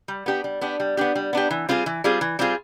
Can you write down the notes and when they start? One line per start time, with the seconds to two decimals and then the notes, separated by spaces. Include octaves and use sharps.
0.08 G3
0.26 B3 D4 G4
0.44 G3
0.61 B3 D4 G4
0.80 G3
0.97 B3 D4 G4
1.15 G3
1.33 B3 D4 G4
1.51 E3
1.69 G3 C4 F4 G#4
1.86 E3
2.04 G3 C4 F4 G#4
2.21 E3
2.39 G3 C4 F4 G#4